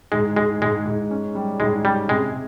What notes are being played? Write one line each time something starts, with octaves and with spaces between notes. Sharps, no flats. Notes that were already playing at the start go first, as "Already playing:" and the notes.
G#2 G#3
G#2 G#3
G#2 G#3
G#2
C#4
G3
G#2 G#3
G3 C#4
C3 G#3